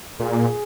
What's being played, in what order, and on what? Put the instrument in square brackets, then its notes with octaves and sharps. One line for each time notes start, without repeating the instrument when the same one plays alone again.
[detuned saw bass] A#2 [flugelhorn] G#4